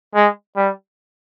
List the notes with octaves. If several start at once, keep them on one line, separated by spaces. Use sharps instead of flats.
G#3
G3